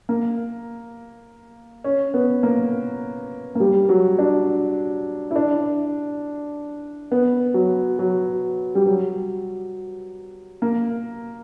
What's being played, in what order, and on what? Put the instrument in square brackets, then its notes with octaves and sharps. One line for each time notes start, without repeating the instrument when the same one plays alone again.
[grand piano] A#3
C#4
B3
A#3
A#3
G3
F#3
D4
E4
D4
B3
F#3
F#3
G3
F#3
A#3